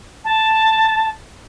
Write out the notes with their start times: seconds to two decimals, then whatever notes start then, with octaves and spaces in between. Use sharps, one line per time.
0.25 A5